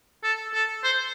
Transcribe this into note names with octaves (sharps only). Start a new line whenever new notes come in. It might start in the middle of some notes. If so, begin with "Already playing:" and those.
A4
A4
C5